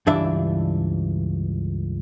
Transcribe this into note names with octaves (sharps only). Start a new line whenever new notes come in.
C#2 G2 E3 D4 E5